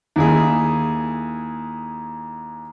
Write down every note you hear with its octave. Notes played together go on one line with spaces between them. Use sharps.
D#2 E4 G#4